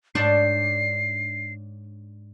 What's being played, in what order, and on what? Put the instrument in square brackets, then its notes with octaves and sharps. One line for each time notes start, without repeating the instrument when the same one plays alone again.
[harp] G#2 C#5 G6 [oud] D4 [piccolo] C7